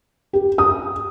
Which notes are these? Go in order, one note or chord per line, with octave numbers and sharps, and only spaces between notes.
G4
D#6